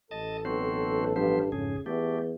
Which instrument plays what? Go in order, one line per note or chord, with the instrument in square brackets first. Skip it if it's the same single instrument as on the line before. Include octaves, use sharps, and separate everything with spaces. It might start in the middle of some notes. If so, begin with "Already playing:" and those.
[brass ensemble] A1 A4 [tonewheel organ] D#5 A5
[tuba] B1 [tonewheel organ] C4 F#4 C5
[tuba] G2 [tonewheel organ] F3 B3 C5
[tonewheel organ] F2 G#2 G#4 [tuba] C#3
[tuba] E2 [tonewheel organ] A3 G4